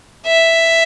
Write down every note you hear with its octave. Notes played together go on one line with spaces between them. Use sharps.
E5